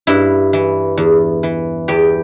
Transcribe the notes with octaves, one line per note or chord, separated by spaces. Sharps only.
G2 E4
E3
E2
E3
E2 G4